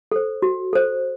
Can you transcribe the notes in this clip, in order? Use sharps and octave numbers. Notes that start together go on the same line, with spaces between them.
A4 C5
F#4
A4 C5